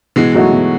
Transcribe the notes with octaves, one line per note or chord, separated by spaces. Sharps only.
B2 E3 G#3
F#3 A3 D#4 F#4
B2